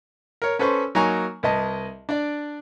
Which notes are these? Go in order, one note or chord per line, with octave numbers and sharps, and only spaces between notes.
A#4 C#5
C#4 A4 B4 C5 C#6
F#3 A#3 D#4 G#5 A#5 C#6
C2 B4 D#5 A5
D4 D5